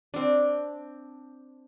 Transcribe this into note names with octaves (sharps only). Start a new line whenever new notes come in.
C4 D4